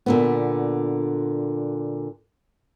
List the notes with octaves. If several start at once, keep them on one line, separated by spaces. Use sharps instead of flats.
A#2 D3 B3